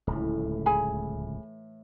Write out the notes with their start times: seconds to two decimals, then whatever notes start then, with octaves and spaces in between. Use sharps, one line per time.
0.07 D1 C#2 A2 E3
0.66 G#4 G#5 B5